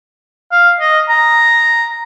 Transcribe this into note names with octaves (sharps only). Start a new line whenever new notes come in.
F5
D#5
A#5